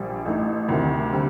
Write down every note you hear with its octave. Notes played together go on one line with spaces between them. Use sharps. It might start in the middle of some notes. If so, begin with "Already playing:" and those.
Already playing: A#1 G3
A1 A2 A3 D#4
D2 C3 D#3
D3 G3 C4